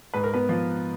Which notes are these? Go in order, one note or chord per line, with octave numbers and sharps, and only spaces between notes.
G#2 B4
A#4
B3 B4
F3